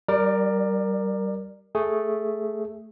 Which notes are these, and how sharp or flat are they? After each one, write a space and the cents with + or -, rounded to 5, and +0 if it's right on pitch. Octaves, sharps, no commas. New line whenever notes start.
G3 -25 A#4 +0 D5 +20
A3 +0 G#4 +0